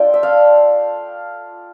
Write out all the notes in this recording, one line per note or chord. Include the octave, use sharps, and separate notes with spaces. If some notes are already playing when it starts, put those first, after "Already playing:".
Already playing: A3 D4 F4 G5 A5
E5
D5 F5